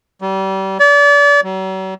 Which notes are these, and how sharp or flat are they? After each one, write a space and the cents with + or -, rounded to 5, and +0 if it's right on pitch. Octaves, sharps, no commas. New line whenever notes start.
G3 -30
D5 -35
F#3 +45